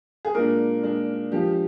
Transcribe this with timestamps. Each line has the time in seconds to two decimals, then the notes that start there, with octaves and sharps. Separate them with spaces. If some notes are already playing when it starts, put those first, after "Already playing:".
0.25 G#4
0.35 A#2 G#3 D4 A#4
0.83 A#2 G#3 D4
1.32 F3 G#3 D4 G4